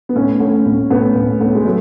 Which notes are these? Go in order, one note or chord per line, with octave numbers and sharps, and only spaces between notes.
B3
A2 C#4
A2
A2
A2 B3
A2
A2
G#3
F#3 A3